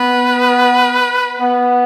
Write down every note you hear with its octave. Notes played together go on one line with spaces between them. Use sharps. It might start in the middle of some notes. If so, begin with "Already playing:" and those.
Already playing: B3 B4
B3